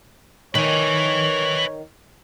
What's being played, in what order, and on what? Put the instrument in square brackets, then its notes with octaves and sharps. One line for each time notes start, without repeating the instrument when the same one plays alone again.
[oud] D#3 [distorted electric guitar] B4 G#5 [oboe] C#5